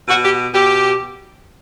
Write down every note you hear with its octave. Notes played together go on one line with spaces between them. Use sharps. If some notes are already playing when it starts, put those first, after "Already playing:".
B2 F#4
G4
B2 G4